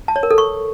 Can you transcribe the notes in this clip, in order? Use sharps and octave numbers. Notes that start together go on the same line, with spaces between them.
A5
C#5
A#4
A4
C#6